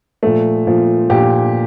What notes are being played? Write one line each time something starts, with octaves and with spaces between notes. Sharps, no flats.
A#2 F3 A3
A#2 F3
A#2 F3 G4